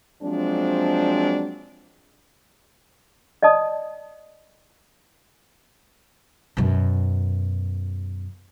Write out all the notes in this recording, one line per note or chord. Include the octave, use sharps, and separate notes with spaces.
F3 F#3 G#3 C4 D4
D5 D#5 A5 D#6
F#2 B2